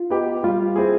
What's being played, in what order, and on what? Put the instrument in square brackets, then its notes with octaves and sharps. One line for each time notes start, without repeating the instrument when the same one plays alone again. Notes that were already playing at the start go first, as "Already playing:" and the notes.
Already playing: [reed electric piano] F4
[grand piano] B3 D#4 G4
[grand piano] G3 [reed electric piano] F4
[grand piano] C4 E4 G#4